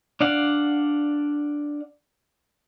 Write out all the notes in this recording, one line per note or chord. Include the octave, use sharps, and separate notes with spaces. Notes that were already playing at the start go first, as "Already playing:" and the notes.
D4 D5 F5 F#5